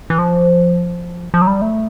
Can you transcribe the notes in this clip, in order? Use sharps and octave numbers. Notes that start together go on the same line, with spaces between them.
E3
F3
F3
F#3
G3
A3